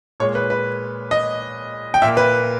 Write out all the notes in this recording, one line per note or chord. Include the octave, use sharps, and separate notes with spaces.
A#2 G#3 C#5
B4
B4
D#5
G5
A#2 A#3 E5
B4